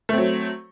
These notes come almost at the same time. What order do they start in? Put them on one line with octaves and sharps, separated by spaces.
A3 C4 F#3